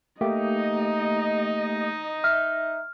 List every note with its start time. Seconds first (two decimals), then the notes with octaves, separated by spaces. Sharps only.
0.21 A3 A#3 D#4 G4 D#5
2.24 E5 F6